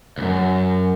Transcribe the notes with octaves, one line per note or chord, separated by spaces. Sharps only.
C#2 F#2